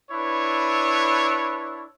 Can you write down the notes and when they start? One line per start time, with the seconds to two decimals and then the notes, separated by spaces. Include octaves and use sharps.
0.11 D4 E4 B4 C#5